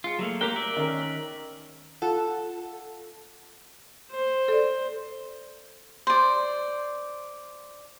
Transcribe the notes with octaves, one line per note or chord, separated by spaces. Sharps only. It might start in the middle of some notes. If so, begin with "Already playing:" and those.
G#3 F4 C#7
F#3 A3 A#3
A#3 G4 A#4 G5 F#6
D5 E5
D#3 C#4 A#4
F4 A4 F#5
C5
A4 D5
C5 D5